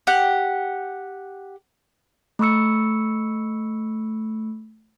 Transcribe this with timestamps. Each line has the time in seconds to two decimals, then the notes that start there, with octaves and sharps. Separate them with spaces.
0.07 G4 F#5
2.39 A3 B5 C#6 E6 C#7